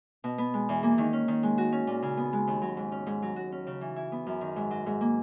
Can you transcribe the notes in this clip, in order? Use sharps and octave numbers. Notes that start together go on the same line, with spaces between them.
B2
B3
G#3
E2
A#3
D#3
C#4
D#3
G#3
F#4
C#4
A#2
C#3
B3
G#3
D#2
F#3
G#2
C#4
G#2
F#3
F#4
C#4
C#3
E3
E4
B3
F#2
D#3
G#2
F#3
G#2
A#3